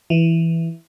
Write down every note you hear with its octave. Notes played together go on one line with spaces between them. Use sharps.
E3